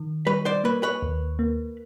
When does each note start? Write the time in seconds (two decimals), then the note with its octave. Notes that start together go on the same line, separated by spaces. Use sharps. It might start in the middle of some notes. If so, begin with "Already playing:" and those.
Already playing: D#3
0.26 G3 B4 C#5
0.45 C5 D5
0.64 A#3 B4 C#5
0.83 B4 C#5
1.02 D#2
1.39 A#3